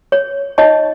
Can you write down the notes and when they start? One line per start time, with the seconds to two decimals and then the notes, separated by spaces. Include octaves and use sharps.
0.12 C#5
0.58 D#4 C#5 D#5 A5